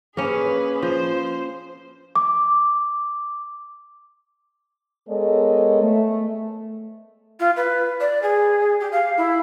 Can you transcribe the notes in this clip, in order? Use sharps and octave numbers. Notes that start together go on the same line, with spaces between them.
A#3 C#4 G#4 B4
F3 C5
D6
G#3 B3 A4 A#4 C#5 D#5
A3
F4
B4
D5
G#4
G4
F5
E4